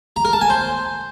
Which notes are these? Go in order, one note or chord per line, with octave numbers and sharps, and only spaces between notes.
A#5
A#4
A5
G#5
C5